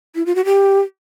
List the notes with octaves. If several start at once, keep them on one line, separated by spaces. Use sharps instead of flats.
E4
F4
F#4
G4